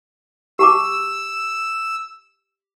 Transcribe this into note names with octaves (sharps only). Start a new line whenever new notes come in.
G4 A5 D6 E6